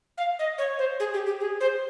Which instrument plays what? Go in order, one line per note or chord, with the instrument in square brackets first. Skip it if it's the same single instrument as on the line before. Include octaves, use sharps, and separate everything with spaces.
[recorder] F5
D#5
C#5
C5
G#4
G4
G4
G#4
C5